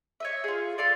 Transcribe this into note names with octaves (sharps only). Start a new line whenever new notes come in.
C#5 D#5 E5
F4 G#4
A4 D5 F5 C6